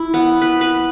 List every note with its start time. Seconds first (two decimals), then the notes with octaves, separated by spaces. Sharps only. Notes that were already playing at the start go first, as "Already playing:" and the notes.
Already playing: E4
0.14 B3
0.42 B4
0.61 B4